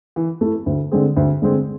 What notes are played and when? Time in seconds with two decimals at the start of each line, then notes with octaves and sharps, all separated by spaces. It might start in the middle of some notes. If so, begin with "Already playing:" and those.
0.16 E3
0.41 A3 E4
0.66 D2
0.92 D3 G#3 C4 G#4
1.17 D2
1.42 D3 G#3 C4 G#4